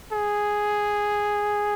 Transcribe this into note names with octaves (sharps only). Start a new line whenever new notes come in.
G#4